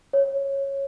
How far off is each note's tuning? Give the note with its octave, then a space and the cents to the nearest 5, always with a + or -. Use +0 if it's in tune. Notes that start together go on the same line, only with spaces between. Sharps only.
C#5 -10